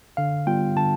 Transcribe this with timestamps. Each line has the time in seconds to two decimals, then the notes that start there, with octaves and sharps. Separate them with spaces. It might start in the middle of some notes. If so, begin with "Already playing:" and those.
0.17 D3 F5
0.47 G3 B3 F4 G5
0.76 D3 A5